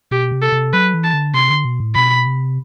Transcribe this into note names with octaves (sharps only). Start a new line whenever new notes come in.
B2 G4
C3
A4
C3
F#3 B4
E3
A5
D3
C3 C6
D3
B2
A2
B2 B5
C3